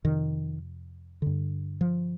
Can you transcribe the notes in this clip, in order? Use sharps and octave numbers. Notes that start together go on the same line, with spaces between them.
F2 C3 D#3
G2 D3
F3